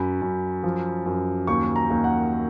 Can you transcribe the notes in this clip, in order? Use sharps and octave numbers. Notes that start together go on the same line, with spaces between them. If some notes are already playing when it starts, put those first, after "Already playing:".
Already playing: F#2 B5
F#2
F3
F#2
D#2 C#6
A#5
D#2
F#5